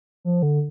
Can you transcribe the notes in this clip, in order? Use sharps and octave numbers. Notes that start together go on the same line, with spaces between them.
F3
D3